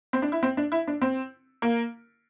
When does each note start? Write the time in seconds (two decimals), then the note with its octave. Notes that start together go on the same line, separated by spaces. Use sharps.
0.13 C4
0.22 D4
0.32 E4
0.43 C4
0.57 D4
0.72 E4
0.87 D4
1.02 C4
1.62 A#3